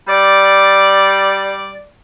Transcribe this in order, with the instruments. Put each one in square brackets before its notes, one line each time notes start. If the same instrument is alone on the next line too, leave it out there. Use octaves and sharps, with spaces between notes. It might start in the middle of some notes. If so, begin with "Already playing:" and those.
[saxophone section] G3 D5